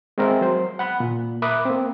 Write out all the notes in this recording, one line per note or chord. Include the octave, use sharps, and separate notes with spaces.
G#3 C4 A#4 E5
F#3 C5
F#5 B5 F#6
A#2
A#4 E5 B5 D6 D#6 F#6
A#3 C4